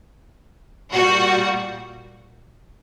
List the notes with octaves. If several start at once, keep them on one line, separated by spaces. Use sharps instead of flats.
A#2 G3 F#4